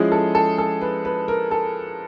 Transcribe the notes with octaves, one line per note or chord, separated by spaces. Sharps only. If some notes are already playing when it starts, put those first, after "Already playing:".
Already playing: F3 G#3 C#4 E4 G#4
A4
A4
A4
B4
B4
A#4
A4